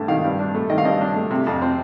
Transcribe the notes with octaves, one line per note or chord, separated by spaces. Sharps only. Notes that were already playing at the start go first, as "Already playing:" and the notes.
Already playing: G2 A3 D4
D#3 F5
G2
D4
A3
D#3 D#5
F5
G2 D#5
D4
A3
C3
F2
C4